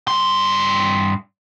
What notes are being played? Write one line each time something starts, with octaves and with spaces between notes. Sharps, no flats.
G2 C6